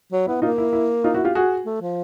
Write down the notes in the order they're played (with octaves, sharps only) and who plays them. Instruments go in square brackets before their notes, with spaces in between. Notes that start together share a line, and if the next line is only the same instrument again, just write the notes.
[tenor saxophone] F#3
[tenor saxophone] B3 [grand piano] E4
[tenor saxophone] A#3 [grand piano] D#4 F4
[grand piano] E4
E4
D#4 F4
E4 F#4
F4 G4
F#4 G#4
[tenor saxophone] A3
F3